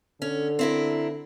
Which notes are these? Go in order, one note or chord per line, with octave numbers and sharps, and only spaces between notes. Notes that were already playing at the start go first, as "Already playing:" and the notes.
D3 C#4
C4 E4 A#4